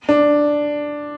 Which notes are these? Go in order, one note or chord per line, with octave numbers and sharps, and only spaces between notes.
D4